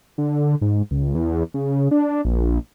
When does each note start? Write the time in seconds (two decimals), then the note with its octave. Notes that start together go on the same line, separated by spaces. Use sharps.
0.18 D3
0.61 G#2
0.91 C#2
1.15 E2
1.54 C#3
1.91 D4
2.25 A#1